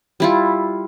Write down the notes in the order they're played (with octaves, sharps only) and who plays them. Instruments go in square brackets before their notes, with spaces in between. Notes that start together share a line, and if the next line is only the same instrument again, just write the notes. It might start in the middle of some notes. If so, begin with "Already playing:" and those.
[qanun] G3 E4 F4